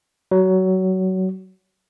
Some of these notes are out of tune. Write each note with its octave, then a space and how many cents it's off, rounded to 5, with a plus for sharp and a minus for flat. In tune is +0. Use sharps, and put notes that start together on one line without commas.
F#3 +20